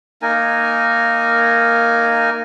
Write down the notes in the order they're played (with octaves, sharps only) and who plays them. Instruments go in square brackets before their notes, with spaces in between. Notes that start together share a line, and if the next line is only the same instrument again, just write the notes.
[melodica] A#3 D#4 A#4 G#5